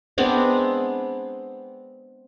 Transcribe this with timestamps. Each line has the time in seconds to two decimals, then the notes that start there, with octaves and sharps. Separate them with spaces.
0.18 G#3 B3 C4 D4